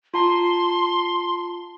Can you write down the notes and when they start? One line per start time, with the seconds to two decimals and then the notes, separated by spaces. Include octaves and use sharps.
0.14 F4 A5 A#5 C6